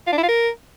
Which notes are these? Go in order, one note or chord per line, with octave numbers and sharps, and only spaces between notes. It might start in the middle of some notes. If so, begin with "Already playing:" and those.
F4
D4
E4
F4
A#4